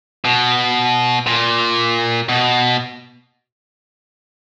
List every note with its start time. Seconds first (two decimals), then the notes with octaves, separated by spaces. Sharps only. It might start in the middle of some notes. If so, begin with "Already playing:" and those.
0.25 B2
1.27 A#2
2.29 B2